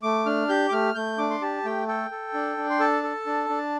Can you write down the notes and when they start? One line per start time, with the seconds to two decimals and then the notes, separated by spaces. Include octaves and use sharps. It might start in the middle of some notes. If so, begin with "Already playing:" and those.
0.03 A3 D6
0.26 D4 F6
0.49 G4 G6
0.69 D6
0.72 A3 F6
0.95 A3 G6
1.18 D4 D6
1.31 C6
1.42 G4 A5
1.65 A3 G5
1.88 A4 G5
2.11 A4
2.34 D4
2.58 D4
2.70 C6
2.80 A4 A5
3.03 A4
3.26 D4
3.49 D4